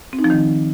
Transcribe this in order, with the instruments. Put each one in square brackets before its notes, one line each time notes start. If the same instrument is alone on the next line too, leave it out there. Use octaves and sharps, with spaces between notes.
[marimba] C4
D#4
F3
D#3